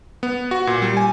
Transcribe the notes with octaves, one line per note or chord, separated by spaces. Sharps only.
B3
F#4
A#2
G3
G#5